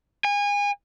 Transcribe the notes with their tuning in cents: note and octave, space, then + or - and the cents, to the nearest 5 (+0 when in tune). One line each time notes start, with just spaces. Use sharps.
G#5 -30